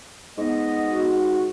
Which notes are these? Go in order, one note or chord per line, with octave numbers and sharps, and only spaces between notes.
G#2 B3 D#5
F#4